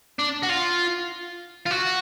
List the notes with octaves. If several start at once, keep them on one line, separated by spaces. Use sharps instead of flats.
D4
F#4
F4
F4
F#4